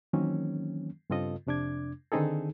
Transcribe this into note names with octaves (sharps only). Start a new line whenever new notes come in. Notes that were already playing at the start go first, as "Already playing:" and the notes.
D#3 E3 F#3 A#3 C4 C#4
G2 C#3 C4 F4 A4 D#5
F2 C3 D4 D6 G#6
D3 D#3 C4 D#4 G#4 A4